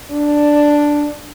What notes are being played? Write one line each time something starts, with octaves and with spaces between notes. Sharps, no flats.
D4